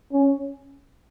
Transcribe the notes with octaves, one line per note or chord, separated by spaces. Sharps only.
C#4